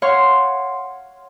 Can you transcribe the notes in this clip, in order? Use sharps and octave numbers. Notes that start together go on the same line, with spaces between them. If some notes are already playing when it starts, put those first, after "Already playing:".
C#5 F5 F#5 C6 C#6